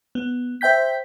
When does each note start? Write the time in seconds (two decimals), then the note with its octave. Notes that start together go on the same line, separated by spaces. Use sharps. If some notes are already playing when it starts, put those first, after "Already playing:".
0.15 B3
0.61 C5 E5 G5 G6 B6